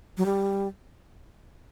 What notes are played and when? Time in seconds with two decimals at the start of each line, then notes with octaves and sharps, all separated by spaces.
0.17 F#3
0.26 G3